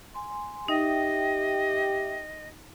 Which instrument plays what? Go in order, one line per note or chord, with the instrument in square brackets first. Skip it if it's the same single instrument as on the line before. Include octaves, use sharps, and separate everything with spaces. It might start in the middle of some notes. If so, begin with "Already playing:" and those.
[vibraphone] G#5 C6
[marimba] D#4 [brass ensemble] G4 [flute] D#5 [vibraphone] E5 G5